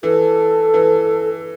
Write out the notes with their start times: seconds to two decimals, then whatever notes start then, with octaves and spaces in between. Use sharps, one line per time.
0.03 E3 A4
0.74 E3